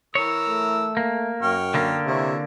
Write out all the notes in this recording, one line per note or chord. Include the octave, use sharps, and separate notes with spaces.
E3 A#4 C#5 E6
A3
A#3
F#2 G5 C#6 F6
D3 A#3
C3 E4 C#5